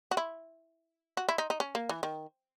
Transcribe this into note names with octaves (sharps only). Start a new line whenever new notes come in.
F#4
E4
F#4
E4
D#4
D#4
C#4
A#3
E3
D#3